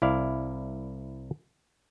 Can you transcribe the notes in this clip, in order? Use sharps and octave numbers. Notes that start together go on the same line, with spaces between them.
C2 E4 D5 F5